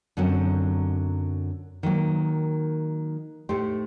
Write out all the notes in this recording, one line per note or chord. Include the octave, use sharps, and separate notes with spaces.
F#2 D3 F#3 C4
D#3 F#3 A#3
A2 A3 D#4 G4 C5